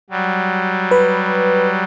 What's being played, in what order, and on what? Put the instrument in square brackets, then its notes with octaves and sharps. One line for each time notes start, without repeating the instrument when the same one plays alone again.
[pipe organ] F#3 G3
[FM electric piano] B4